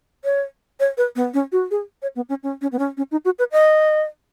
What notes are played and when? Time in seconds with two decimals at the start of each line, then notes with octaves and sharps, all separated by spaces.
0.24 C#5
0.80 C#5
0.97 B4
1.16 B3
1.34 C#4
1.52 F#4
1.71 G#4
2.02 C#5
2.16 B3
2.29 C#4
2.43 C#4
2.62 C#4
2.72 B3
2.79 C#4
2.97 C#4
3.11 D#4
3.25 F#4
3.39 B4
3.52 D#5